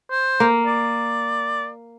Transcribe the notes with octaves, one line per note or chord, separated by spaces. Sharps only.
C5
A#3
D5